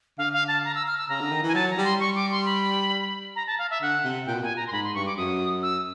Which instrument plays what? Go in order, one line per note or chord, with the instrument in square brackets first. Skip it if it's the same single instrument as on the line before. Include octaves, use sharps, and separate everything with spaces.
[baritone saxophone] D3 [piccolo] F5
[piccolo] F5
A5
A#5
E6
F6
E6
[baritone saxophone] C#3 [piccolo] A#5
[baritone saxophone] D3
D#3
E3
[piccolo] G#5
[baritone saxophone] F#3 [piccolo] A5
[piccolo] A#5
[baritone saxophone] G3
[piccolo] C6
[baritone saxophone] G3 [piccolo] C#6
[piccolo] D6
C6
B5
A#5
A5
F5
E5
[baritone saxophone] D3 [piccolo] F#5
[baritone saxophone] C3
[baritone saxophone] A#2 [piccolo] G5
[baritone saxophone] B2
[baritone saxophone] A#2 [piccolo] G#5
[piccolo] A#5
C6
[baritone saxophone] G#2 [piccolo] B5
[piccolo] C6
[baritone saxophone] G2 [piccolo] C#6
[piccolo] D6
[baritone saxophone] F#2 [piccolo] D#6
[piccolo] E6